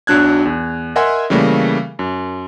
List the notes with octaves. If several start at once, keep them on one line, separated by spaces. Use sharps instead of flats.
B1 F#3 D4 F#6 G#6
E2
A#4 D#5 E5 F#5 G#5 C6
C#3 E3 G3 A3 A#3
F#2